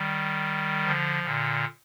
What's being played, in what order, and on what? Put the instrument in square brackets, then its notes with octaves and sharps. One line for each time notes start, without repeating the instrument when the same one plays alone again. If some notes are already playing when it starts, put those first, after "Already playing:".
Already playing: [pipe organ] D#3 G3
D3 F3
A#2 D3